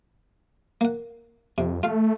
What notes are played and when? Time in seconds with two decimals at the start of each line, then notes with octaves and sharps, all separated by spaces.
0.81 A#3 F#5
1.58 F2 C3
1.83 A3 F4 F5